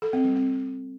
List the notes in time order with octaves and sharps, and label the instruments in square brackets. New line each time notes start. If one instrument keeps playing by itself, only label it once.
[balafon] A4
C4
G3
C4